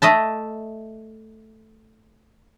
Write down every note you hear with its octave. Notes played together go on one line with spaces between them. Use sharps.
A3 D#5 E5 A5